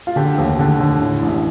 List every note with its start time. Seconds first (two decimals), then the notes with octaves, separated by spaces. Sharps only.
0.07 F4
0.16 D3 G4
0.38 D#2
0.59 D3
0.80 D3
1.02 A2
1.23 A1